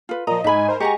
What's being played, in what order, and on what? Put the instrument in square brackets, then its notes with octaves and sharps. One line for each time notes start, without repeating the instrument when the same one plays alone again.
[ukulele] F4 B4
[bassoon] A#2 [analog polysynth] F3 D#5 [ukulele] A#5
[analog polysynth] G#2 G#5 [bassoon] D#4 [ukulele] E5 B5
[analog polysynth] A#4 C5
[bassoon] G#3 [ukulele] G4 F#5 G#5 [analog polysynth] A#5 C#6